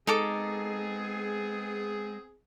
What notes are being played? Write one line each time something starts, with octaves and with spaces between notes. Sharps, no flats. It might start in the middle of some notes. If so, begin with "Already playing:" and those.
G#3 B3 C4 D#4 G#4 A4 D6